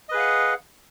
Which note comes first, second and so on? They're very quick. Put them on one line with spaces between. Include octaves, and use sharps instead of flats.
D#5 B4 G#4 F5 F#5